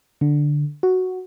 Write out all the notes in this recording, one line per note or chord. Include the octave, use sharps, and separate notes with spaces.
D3
F#4